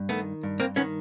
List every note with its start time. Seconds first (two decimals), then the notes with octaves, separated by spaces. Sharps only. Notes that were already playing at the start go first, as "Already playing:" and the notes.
Already playing: G2
0.09 D#3 A3 B3
0.43 G2
0.60 A#3 C4
0.76 D#3 B3 C#4